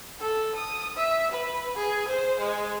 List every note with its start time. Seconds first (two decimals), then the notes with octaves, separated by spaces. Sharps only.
0.20 A4
0.55 D#6
0.97 E5
1.31 B4
1.75 G#4
2.08 C5
2.40 G#3